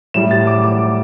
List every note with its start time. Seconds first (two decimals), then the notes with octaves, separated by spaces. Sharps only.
0.14 A2 G3 E7
0.31 A6
0.47 D6
0.64 D6